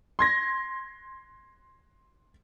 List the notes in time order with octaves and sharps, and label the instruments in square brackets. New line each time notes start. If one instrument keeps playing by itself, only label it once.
[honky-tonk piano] C6 G#6 A#6